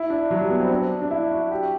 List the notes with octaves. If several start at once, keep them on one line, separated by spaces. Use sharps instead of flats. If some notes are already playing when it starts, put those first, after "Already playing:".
Already playing: E4
D4
F#3
G3
B3
C4
D4
D4
E4
F#4
G4